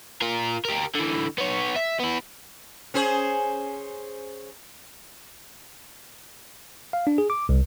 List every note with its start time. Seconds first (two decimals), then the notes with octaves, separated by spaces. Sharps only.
0.22 F4 A#4
0.65 G4 A#4
0.95 D3 E3
1.38 B3 C#5
1.76 E5
2.00 B3 E4
2.94 C#4 G#4 C5
6.93 F5
7.07 D4
7.18 G#4
7.30 D6
7.49 C2